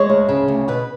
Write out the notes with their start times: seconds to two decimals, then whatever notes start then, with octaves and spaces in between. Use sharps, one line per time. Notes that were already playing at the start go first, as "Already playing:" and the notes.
Already playing: G#3 C#5
0.10 D2
0.29 C#3
0.48 D2
0.68 B2 B4